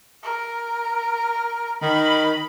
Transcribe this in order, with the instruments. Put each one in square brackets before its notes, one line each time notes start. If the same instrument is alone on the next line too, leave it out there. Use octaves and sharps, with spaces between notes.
[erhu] A#4
[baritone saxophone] D#3 [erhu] B5